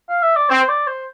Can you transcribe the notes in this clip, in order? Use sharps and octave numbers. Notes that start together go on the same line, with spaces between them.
F5
E5
D5
C4 C5
C5
D5
C5